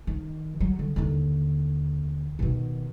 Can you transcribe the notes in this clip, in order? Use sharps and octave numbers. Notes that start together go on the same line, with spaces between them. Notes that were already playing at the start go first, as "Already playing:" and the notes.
D#3
F#3
D3
D#2 D3
B2 D#3